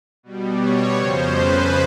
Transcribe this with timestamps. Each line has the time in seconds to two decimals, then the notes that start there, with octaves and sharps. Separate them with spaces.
0.23 B2 G3
0.60 C#5
0.96 F2 C#3 F3 C5
1.32 B4